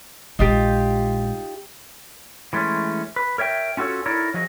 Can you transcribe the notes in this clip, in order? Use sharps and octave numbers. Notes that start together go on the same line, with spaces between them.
A#1 G#3 D#4 F4 G4
E3 G#3 A3 C#4
B4
A#4 C#5 E5 G5
C#4 F4 F#4 A4 C#5
D#4 E4 A4 A#4 C#5 D5
F3 F#3 G#4 D#5